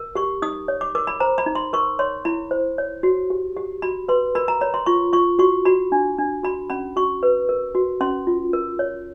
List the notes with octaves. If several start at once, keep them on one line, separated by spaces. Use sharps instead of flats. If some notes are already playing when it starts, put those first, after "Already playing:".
Already playing: A#4
G4 C#6
D#4 D#6
C#5
D6
A#4 D6
B5
C5 A#5
B5
D#4
C6
A#4 C#6
C#5 C6
E4 B5
C5
C#5
F#4
G4
G4
F#4 B5
B4 C6
A#4 B5
A#5
C#5 B5
C6
F4 C#6
F4 C#6
F#4 C#6
F#4 B5
D4
D4
F#4 B5
C#4 B5
F#4 C#6
B4
A#4
F#4
C#4 C6
F4
A#4
C#5